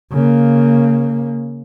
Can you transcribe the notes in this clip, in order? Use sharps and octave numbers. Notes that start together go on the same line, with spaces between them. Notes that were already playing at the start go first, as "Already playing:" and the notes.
C#3 A#3